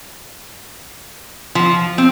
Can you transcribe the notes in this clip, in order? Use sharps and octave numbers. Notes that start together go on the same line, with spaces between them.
F3
C4